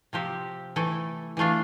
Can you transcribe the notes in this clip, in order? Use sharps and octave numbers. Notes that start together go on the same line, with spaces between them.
C3 F3 C4 G4
E3 A3 E4 A4
E3 A3 D4 F4